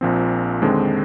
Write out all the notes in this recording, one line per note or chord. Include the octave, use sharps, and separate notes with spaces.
A#1 A#2 F3 C4
D#2 D3 G#3 C4